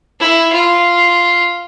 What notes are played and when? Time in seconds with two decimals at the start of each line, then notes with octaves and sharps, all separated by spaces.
0.20 E4
0.53 F4